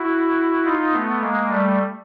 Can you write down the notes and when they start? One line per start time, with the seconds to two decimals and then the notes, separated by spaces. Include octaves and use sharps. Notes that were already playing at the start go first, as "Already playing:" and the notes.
Already playing: E4 F#4
0.65 D#4 F4
0.93 A3 B3
1.20 G#3 A#3
1.48 G3 A3